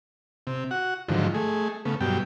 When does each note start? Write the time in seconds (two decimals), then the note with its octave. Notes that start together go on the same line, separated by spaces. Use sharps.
0.47 C3
0.71 F#4 F#5
1.08 G#2 D3 D#3 F3 F#3
1.34 A3 G#4
1.85 C#3 A3 B3
2.01 G2 B2 F#3 G3 G5